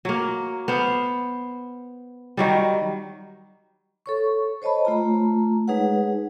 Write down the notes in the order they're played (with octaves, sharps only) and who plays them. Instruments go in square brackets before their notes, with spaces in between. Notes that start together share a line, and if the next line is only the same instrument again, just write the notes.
[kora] F#3 A#3
B3 C5 F5
D#3 F#3 G3
[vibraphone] A4 C#5 C#6
C5 C#5 D#5 A5 B5
A3 F4 A#5
G#3 D#4 G#4 B4 C#5 F#5